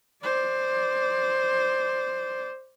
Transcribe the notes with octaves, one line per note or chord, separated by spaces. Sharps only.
C5 D5